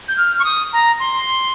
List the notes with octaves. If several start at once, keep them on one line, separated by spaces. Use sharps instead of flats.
G6
F6
C#6
D#6
A#5
C6